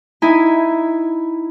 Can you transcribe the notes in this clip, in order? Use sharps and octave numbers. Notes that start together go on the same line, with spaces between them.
D#4 E4 G#5